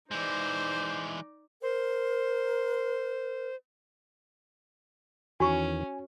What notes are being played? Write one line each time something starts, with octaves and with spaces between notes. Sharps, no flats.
E3 G#3 D#4 C5 D5
A#4 C5
E2 D#3 E3 C#4 F#4 G#5 C#6